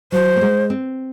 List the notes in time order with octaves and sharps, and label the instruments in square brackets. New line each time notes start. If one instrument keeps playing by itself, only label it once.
[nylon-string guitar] F#3 [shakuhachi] C5
[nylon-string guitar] A#3
G#3
C4